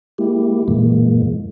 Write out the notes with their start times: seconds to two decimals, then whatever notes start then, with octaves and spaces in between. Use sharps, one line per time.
0.18 G#3 A#3 E4 G4
0.68 F#2 A#2 E3 G#3 A#3